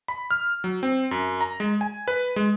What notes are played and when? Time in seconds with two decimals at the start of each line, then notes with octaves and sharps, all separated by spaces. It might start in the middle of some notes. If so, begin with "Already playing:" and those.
0.08 B5
0.31 F6
0.64 F#3
0.83 C4
1.11 F#2
1.41 A#5
1.60 G#3
1.81 G#5
2.08 B4
2.36 G#3